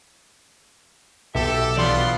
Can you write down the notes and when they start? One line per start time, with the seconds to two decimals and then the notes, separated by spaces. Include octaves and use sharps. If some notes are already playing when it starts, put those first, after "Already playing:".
1.35 B1 G4 A4 E5
1.77 B2 E3 B3 F4 D5 C6